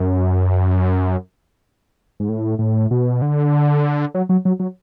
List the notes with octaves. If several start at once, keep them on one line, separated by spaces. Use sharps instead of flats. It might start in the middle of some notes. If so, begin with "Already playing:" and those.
Already playing: F#2
G#2
A2
A2
B2
D3
F#3
F#3
F#3
F#3